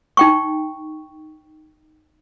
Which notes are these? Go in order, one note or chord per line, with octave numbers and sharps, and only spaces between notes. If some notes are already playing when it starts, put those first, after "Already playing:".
D#4 G5 C#6